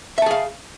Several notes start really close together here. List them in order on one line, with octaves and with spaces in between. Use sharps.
E5 A5 G#4 F5